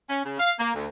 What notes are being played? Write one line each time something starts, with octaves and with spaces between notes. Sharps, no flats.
C#4
C#3
F5
A#3
D2